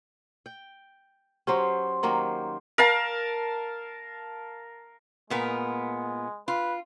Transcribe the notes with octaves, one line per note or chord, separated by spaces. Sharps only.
G5
F#3 C#4 G4 C5
D#3 F#3 A#3
A#4 F5 A5
A#2 G#3 B3 A#4
F4 B4